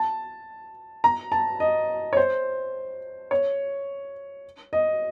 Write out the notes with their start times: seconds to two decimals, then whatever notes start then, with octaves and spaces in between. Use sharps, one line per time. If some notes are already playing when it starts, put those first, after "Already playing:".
Already playing: A5
1.04 A#5
1.32 A5
1.60 D#5
2.13 C#5
2.17 C5
3.31 C#5
4.73 D#5